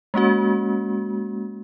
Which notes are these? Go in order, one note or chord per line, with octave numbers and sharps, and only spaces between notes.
G#3 A#3 C#4 F#4